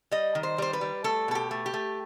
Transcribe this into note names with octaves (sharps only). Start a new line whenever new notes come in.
G3 D#5
D#3
C5
G3 C5
B4
G3
A3 A4
B2 A4
G4
A3
G4
A3